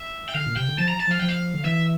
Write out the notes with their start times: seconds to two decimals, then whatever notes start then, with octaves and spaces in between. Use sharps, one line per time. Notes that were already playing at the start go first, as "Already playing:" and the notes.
Already playing: E5
0.28 G5
0.34 D3 F5
0.46 A#2
0.56 C3 G5
0.68 D3
0.78 F3 A5
0.89 A#5
1.00 A5
1.07 F3 F5
1.19 F3 G5
1.28 F5
1.54 D3
1.64 E3 E5